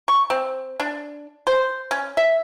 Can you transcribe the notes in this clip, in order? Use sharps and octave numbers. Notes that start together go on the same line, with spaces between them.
C#6
C4
D4
C5
C#4
E5